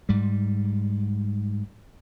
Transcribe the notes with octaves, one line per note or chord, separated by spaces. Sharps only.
G#2 G3